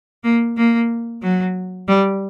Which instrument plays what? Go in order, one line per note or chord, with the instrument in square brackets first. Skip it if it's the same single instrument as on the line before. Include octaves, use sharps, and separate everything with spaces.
[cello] A#3
A#3
F#3
G3